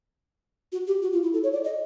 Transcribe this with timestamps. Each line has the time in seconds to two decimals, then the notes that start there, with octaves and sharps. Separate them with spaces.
0.72 F#4
0.87 G4
1.02 F#4
1.13 F4
1.23 E4
1.33 A4
1.43 C#5
1.53 D5
1.64 D#5